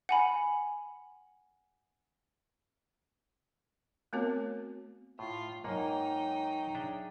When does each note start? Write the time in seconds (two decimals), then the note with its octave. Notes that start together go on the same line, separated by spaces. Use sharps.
0.09 F#5 G#5 B5
4.13 A3 B3 C4 F#4 A#4 C#5
5.19 A2 F4
5.64 G#2 F#3 A#3 D#4 F#5 G5
6.75 D4 G#4 E5